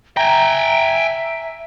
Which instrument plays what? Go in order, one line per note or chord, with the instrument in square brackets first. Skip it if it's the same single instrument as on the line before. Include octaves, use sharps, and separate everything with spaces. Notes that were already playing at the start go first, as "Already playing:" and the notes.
[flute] E5 [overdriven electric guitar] G5 G#5 [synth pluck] A#5